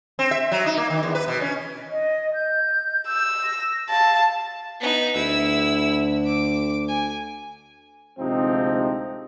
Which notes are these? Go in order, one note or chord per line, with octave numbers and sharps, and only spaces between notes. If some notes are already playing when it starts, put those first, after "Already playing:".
C4
E5
F#3
D#4
A#3
D#3
E2
B4
B2
C#4
D#5
G6
E6
A#6
F5 A5
B3 D#4
D2 E4 E6
D6
G#5
D2 G#2 C3 F3 C4 D#4